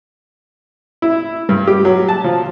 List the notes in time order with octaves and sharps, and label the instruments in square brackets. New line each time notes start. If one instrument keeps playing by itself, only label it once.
[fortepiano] E4
G2
G4
F#3
A5
F3